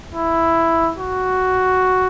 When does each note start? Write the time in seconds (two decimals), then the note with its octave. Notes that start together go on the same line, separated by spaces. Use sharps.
0.15 E4
0.99 F#4